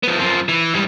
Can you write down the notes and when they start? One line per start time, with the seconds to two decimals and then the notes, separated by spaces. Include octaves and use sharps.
0.03 F3 B3
0.19 F#2 F3
0.49 E3
0.74 G#2 G3